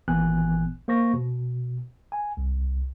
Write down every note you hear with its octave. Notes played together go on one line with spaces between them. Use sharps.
G#1 A#2 E3 B3 G#5 F#6
A#3 C5 C#6 A#6
B2
G#5
C2